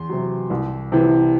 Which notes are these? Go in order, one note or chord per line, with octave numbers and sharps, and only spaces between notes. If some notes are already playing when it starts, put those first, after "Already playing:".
Already playing: E2 C6
C3 F#3
C2
C3 E3